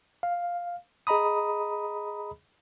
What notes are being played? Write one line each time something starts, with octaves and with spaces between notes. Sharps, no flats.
F5
G#4 D#5 A#5 B5 D#6